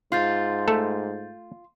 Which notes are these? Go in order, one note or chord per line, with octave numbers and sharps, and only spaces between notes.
G#2 F4 C6 G6 A6
A3 A4